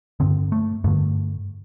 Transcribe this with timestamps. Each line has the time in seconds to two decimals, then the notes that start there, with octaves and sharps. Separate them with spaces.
0.20 G2 D3 C4
0.52 A3
0.84 G2 D3 A3